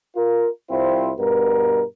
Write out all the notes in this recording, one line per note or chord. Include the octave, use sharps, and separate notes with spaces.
F4 A#4
C2 C4 E4 F4 C5
G2 B2 B3 A#4